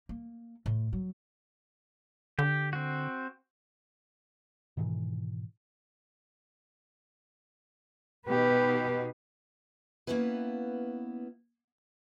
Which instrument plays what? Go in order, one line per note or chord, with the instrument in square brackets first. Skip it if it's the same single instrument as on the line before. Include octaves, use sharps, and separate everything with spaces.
[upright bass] A#3
A2
F#3
[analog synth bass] D3 [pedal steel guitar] G4
[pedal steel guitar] C4 F#4
[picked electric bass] G#2 B2 D#3 E3
[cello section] B2 D#4 [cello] G4 B4
[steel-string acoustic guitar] A#3 B3 C#4 E4 B4